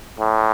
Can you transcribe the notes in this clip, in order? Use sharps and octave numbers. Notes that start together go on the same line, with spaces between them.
A2